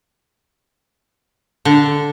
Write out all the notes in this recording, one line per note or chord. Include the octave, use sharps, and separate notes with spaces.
D3